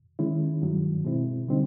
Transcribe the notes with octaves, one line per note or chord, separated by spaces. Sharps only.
D#3 G#3 C#4 E4
G2 D#3 F#3
B2 G#3 C4 E4
D3 G3 C4 D#4